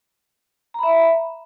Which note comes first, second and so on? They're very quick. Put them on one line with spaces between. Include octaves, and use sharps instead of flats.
A#5 B5 E5